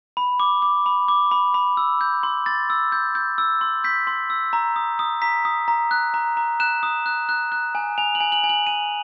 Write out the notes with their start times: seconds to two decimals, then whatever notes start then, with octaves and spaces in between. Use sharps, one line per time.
0.17 B5
0.40 D6
0.62 D6
0.86 B5
1.08 D6
1.31 B5
1.54 B5
1.77 E6
2.01 G6
2.23 C6
2.46 C6 A6
2.70 E6
2.92 G6
3.15 G6
3.38 E6
3.61 C6
3.84 G6 B6
4.07 C6
4.30 E6
4.53 A#5
4.76 D#6
4.99 D#6
5.22 A#5 B6
5.45 D#6
5.68 A#5
5.91 F#6
6.14 A#5
6.37 A#5
6.60 F#6 E7
6.83 D#6
7.06 F#6
7.29 F#6
7.52 F#6
7.75 G#5
7.98 G#5 F7
8.15 F#7
8.20 G#5
8.32 F#7
8.44 G#5
8.49 F#7
8.67 G#5 D#7